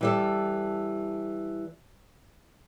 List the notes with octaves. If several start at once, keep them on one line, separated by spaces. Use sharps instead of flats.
E3 G3 A4